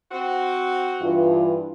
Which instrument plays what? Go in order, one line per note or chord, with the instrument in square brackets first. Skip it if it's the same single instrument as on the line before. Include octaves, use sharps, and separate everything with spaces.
[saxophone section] C4 F#4
[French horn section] G2 E3 F4